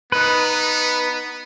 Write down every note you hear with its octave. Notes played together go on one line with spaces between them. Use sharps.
B3 D#4 B4